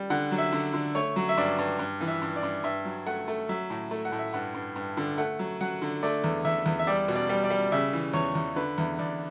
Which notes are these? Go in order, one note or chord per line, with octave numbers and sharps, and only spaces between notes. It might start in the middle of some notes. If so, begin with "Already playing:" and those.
Already playing: G3
D3 F#5
F#3
E5
D3
D3
A3 C#5
F#3
E5
G2 D5
G2
G2
E3
E5
G2
D5
G2
G2 E5
F#3
A3 F#5
A3
F#3 E5
A2
A3
F#5
A2
E5
G2 F#5
G2
G2
D3
A3 F#5
F#3
F#3 F#5
D3
A3 D5
E2
E2 E5
E2
E5
G3 D5
B2
D5
G3
D5
G3
C#3 E5
E3
E2 C#5
E2
D3 B4
E2
E2 D5